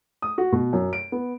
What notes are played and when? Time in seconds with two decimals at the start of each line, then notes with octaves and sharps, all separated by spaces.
0.22 D#6
0.38 F#4
0.52 B2
0.73 F#2
0.93 D7
1.12 B3